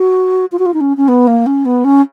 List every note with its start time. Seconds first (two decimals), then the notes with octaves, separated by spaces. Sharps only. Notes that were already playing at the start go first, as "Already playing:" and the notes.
Already playing: F#4
0.51 F4
0.58 F#4
0.65 F4
0.73 D#4
0.80 C#4
0.97 C#4
1.08 B3
1.27 A#3
1.46 C#4
1.65 B3
1.84 C#4